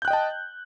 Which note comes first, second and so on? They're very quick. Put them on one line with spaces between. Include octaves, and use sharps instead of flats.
G6 F#6 G5 D#5 A5